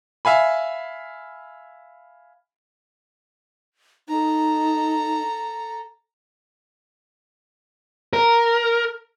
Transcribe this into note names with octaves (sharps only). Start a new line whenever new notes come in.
E5 F5 G#5 B5
D#4 A4 A#5
A#4